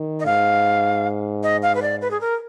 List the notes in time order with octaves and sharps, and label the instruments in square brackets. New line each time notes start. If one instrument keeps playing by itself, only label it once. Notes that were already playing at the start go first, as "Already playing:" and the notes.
Already playing: [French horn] D#3
[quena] D#5
[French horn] G#2 [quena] F5
[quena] D#5
F5
B4
D5
B4
G#4
A#4